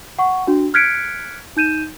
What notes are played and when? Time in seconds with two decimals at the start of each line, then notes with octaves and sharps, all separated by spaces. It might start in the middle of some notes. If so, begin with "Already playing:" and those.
0.19 F#5 C#6
0.47 D4 F#4
0.74 F6 F#6 G#6 B6 C#7 D7
1.57 D#4 G6 D#7 E7